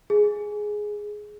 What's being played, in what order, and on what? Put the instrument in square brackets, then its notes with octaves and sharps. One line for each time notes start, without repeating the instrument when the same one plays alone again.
[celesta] G#4